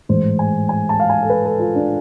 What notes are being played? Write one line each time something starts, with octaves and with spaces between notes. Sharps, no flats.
A1 G#2 E3 C5
G#5
G#5
A5
F5
G#5
A4
B4
A4
F4
D4